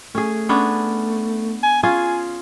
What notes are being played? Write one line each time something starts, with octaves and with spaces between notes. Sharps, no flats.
A3 C#4 G#4
B3 C#4 D4
G#5
C#4 F4 G#4 G#5